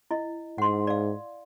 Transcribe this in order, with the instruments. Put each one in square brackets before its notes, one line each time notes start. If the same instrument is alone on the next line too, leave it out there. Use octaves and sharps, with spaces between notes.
[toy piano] E4 D#5
[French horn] G#2 [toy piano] F#5 C6
[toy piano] D5 F5